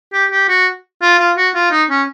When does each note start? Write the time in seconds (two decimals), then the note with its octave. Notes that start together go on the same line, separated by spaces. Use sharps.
0.13 G4
0.31 G4
0.48 F#4
1.02 F4
1.19 F4
1.37 F#4
1.55 F4
1.71 D#4
1.90 C#4